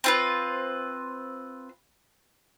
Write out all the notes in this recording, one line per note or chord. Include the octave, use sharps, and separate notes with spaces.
C4 F4 B4